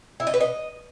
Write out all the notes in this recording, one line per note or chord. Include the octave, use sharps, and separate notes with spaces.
E4
D#5
B4
D#5